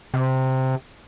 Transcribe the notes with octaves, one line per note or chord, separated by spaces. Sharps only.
C3